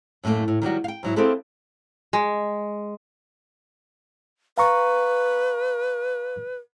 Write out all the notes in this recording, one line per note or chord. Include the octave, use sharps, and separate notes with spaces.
F#2 A2 D#3 A3 A#3
A2
D#3 F#3 G3 F#4
F5 G5
G#2 F#3 E4
A#3 C4 E4 G#4 A4 B4
G#3
B4 F5 A#5 C#6